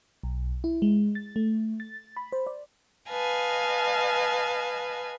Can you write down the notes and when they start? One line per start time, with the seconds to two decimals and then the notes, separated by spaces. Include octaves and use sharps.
0.23 B1
0.64 E4
0.82 G#3
1.15 A6
1.36 A3
1.80 A6
2.17 B5
2.32 C5
2.47 D5
3.10 B4 D#5 F5 G#5 A5